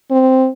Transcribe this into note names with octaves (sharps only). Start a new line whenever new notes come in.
C4